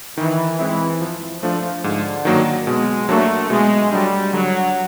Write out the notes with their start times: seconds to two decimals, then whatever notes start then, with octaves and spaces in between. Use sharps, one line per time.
0.17 D#3 E3
0.59 E3 G#3 C4 E4
1.01 F3
1.42 F3 A3 D4
1.84 G#2 D3
2.25 D#3 F#3 A#3
2.66 B2 G#3
3.09 F#3 A3 A#3 D4 F#4
3.50 B2 G#3
3.91 F#3 G3 A3 D4 G4
4.33 D3 F#3